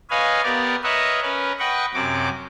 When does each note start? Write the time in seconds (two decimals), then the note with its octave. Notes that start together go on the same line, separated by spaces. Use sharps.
0.10 B4 C#5 D#5 F5 G#5
0.43 B3 G4 A#4 D5
0.84 A#4 B4 C#5 D#5 E5 F#5
1.22 C#4 A#4 B4
1.59 B4 D#5 F#5 G5 C#6
1.94 F#2 C3 F#4 D6